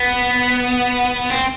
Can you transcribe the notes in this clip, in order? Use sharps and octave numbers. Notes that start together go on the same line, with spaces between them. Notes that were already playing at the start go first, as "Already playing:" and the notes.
Already playing: B3
C4